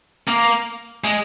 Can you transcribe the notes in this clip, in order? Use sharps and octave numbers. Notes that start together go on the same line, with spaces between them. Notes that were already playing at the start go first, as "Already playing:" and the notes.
A#3
G#3